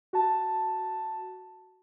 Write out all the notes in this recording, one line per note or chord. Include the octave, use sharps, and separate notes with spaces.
F#4 A5